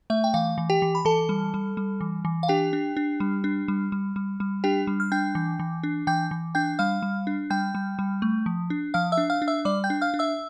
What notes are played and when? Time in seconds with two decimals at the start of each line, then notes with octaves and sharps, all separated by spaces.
0.10 A3 E5
0.24 G5
0.34 E3 F5
0.58 E3
0.70 G4 G5
0.82 E3
0.95 B5
1.05 E3 A4 A5
1.29 G3
1.54 G3
1.77 G3
2.01 E3
2.25 E3
2.43 F5
2.48 D4 G4 G5
2.73 D4
2.97 D4
3.20 G3
3.44 D4
3.68 G3
3.92 G3
4.16 G3
4.40 G3
4.64 D4 G4 G5
4.87 G3
5.00 F6
5.12 D4 G5 G6
5.35 E3
5.59 E3
5.83 D4
6.07 E3 G5 G6
6.31 E3
6.55 D4 G5 G6
6.79 G3 F5 F6
7.02 G3
7.27 D4
7.50 G3 G5 G6
7.75 G3
7.99 G3
8.22 A3
8.46 F3
8.70 D4
8.94 F3 F5 F6
9.12 E5 E6
9.17 D4
9.30 F5 F6
9.42 D4
9.48 E5 E6
9.65 G3 D5 D6
9.84 G5 G6
9.90 D4
10.01 F5 F6
10.14 D4
10.19 E5 E6